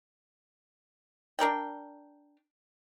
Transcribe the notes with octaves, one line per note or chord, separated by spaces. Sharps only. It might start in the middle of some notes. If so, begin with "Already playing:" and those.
D4 A#4 D5 G5